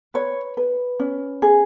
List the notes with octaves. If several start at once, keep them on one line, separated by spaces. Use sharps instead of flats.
B4 C#5
B4
C#4
G#4